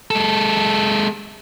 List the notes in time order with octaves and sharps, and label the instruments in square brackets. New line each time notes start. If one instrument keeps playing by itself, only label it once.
[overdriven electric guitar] G#3 A4